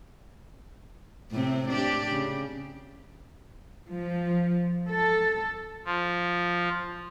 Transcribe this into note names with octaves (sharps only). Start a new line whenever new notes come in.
A2 C3 C4
D4 G4
C#3
F3
A4
F3